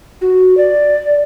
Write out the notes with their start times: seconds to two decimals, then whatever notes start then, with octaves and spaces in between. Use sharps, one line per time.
0.21 F#4
0.57 D5